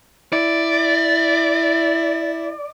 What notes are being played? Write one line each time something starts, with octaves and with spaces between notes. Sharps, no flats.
E4 D5